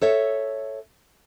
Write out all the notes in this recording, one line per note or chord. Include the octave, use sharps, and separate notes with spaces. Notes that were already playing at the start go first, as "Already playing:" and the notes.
A4 C#5 E5